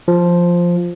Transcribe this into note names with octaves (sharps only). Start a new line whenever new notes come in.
F3